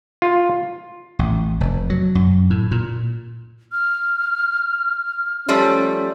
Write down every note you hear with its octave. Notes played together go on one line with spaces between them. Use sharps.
F4
A1
F1
F#3
F#2
A2
A#2
F6
F3 G3 A3 C#4